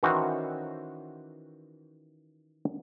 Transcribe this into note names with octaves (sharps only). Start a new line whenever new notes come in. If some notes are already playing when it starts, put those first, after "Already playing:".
D#3 E3 C#4 E4 F#4 C5